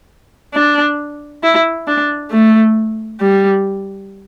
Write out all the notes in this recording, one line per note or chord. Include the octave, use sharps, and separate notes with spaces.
D4
E4
D4
A3
G3